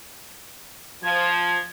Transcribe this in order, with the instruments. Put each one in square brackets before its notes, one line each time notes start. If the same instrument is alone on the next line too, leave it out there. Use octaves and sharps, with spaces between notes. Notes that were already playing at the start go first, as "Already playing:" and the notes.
[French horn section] F3 [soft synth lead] G#6